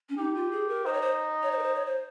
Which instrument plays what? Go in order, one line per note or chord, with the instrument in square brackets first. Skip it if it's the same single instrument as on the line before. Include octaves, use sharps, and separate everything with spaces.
[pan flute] C#4
[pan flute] D#4 [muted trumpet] G4
[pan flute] F4
G#4
A#4
[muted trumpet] D#4 [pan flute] C5
[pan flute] C#5
C5
C#5
C5
A#4
C5
C#5
C5